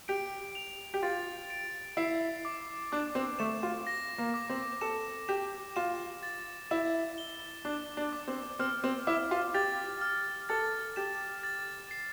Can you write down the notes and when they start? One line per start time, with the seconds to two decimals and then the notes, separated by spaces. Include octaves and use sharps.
0.08 G4 D7
0.55 F7
0.94 G4
1.03 F4 A6
1.50 D7
1.97 E4 C7
2.45 D6
2.92 D4 D6
3.15 C4
3.39 A3 E7
3.63 F4
3.87 A#6
4.18 A#3
4.34 D6
4.50 C4
4.81 A4 E7
5.28 G4 E7
5.76 F4 E7
6.23 A6
6.71 E4 E7
7.18 G7
7.65 D4 D6
7.97 D4
8.13 D6
8.28 C4
8.59 C4 F6
8.84 C4
9.07 E4 D6
9.31 F4
9.54 G4 A6
10.01 F6
10.49 A4 A6
10.96 G4 E7
11.43 A6
11.91 C7